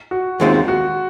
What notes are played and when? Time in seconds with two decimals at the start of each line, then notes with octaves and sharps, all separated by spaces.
0.11 F#4
0.40 D#2 D#3 G#3 C4 F4
0.68 F#4